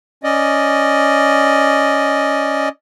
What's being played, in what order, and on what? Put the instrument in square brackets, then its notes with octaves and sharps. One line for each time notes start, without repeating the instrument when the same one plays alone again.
[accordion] C#4 D5 D#5